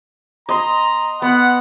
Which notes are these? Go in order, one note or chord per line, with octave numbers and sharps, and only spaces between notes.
D#5 A#5 C6
B3 F#5